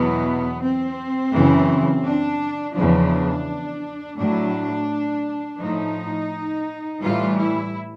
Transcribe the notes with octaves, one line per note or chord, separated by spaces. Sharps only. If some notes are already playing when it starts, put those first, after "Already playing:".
Already playing: E2 B2 F#3 B3
C4
F#2 C#3 E3
D4
E2 C#3 F3 D4
A2 F#3 D4
A2 F3 D#4
A2 E3 G3 F4
E4